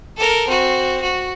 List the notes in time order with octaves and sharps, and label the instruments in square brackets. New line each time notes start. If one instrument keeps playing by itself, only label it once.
[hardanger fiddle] A4 A#4
C4 F#4
F#4